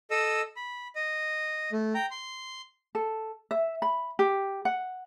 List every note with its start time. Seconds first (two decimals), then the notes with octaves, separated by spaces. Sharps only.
0.11 A4 D#5 E6
0.56 B5
0.96 D#5
1.72 A3
1.95 G5 A#5
2.11 C6
2.95 A4
3.51 E5
3.82 B5
4.19 G4
4.65 F#5